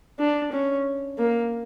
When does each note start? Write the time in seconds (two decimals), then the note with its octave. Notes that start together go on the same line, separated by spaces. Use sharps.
0.19 D4
0.52 C#4
1.18 A#3